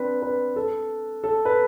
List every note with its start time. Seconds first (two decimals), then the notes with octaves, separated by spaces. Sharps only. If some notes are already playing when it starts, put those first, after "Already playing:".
Already playing: C4 D4 B4
0.22 B4
0.56 A4
1.24 A4
1.45 B4